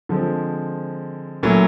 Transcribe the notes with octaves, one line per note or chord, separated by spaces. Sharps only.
D3 F3 G#3 C4
A#2 F#3 A3 C#4 E4